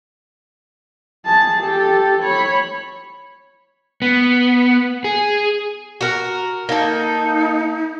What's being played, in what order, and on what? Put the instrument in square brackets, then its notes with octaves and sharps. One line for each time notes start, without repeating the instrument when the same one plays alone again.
[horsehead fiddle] G#4 A5
G4 A4
C#5 B5
[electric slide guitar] B3
G#4
[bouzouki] F#4 A#4
[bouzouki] A#3 A4 [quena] D#4